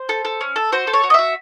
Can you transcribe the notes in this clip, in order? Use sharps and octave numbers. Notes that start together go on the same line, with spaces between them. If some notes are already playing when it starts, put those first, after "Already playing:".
Already playing: C5
A4
A4
C#4
A4
F#4 C5
A4
C#5
F#4
D#5
F#4 E5